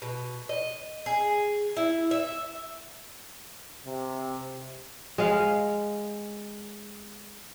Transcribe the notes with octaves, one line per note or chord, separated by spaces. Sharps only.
B2
D#5
G#4
E4
E5
C3
G#3 F5